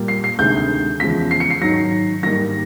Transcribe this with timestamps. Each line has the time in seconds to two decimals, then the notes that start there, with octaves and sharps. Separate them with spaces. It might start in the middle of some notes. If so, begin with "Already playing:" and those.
Already playing: A#2 G3 A#3
0.08 C7
0.24 C7
0.39 D2 C3 D#3 G#3 G6
1.00 E2 C#3 F3 G#3 B6
1.31 C7
1.40 C#7
1.50 C7
1.61 G#2 D#3 F#3 A#6
2.23 G#2 D#3 G3 A#3 A#6